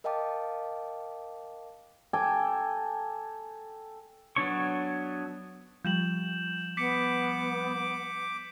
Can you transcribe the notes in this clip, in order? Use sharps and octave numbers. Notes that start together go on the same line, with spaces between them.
A#4 D#5 F5 G5 A5 D6
A4 G5 G#5 D6
F#3 B3 D4 C#5 C#6
F3 G3 G6 E7 F#7
B3 D6 B6 C#7